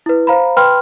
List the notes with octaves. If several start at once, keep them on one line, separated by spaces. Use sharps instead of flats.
E4 B4
C5 F5 A#5 B5
B4 G5 B5 C6 F6